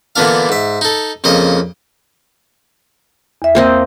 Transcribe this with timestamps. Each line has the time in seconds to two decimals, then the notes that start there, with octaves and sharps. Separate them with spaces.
0.16 A#2 D3 E3 B3 D4 F5
0.49 G#2 E5
0.81 D#4 A4
1.24 F2 A#2 C#3 D#5
3.42 E2 E5
3.55 A#3 C4 D#5